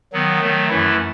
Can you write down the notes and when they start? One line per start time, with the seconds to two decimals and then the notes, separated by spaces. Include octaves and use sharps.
0.13 D#3 F#3 B3
0.40 D#3 F#3 A3
0.69 F#2 E3 A3 E4